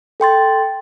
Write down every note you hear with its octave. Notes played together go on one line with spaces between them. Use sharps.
A4 G5 C6 A6